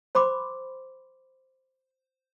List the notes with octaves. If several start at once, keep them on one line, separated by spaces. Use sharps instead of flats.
C5 B5 C6 D6